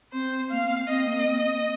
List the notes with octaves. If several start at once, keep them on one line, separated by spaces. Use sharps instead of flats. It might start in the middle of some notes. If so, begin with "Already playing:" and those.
C4 C5
A#3 F5
C4
C4 D#5
A#3
C4
C4